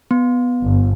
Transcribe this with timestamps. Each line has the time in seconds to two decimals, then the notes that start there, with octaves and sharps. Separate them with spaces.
0.11 B3
0.63 G1